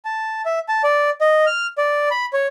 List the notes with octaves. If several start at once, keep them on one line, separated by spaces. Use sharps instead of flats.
A5
E5
A5
D5
D#5
F6
D5
B5
C#5